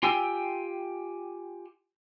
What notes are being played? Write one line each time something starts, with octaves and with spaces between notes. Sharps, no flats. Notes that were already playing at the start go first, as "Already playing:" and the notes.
F4 G4 G5 G#5 E6